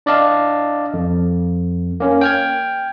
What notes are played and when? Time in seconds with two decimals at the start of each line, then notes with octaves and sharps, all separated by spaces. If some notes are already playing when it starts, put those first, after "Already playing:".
0.06 D4 D5 D#5 F5 A5
0.94 F2
2.00 A#3 C#4
2.21 G5 F6 G#6